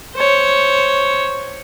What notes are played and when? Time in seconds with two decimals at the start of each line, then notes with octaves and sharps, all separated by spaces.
0.15 C5 C#5